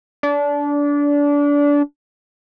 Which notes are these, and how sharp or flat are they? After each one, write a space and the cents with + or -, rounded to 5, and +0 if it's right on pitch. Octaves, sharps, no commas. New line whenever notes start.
D4 -25